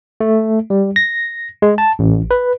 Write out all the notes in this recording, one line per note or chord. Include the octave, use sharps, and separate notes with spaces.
A3
G3
A#6
G#3
A5
A1
B4